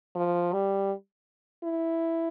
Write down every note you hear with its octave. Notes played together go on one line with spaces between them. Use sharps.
F3
G3
E4